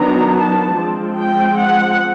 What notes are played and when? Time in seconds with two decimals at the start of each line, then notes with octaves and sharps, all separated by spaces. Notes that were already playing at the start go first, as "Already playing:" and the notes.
Already playing: D#3 F#3 B3 D4 A#5
0.35 A5
0.77 F3 G#3 C4
1.18 G5
1.59 F#5